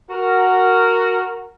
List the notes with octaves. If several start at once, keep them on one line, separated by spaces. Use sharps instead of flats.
F#4 A#4